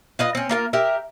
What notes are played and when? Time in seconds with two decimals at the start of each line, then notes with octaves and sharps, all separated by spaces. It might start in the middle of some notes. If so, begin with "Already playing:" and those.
0.19 F4 B4 D#5
0.35 C4 C#4
0.49 A#3 F4 A#4
0.73 G4 A#4 E5